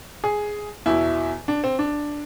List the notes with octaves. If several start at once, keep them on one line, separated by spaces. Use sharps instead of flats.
G#4
E2 B2 E4
D4
C4
D4